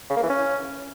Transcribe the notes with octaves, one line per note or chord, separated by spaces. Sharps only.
C#3
A#3
E3
C#4